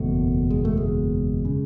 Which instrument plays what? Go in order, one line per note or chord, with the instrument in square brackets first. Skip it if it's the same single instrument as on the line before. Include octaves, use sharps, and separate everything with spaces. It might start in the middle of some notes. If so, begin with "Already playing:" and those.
Already playing: [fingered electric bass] F#1 E2 B2 A3
G#3
A3
G#3
C#3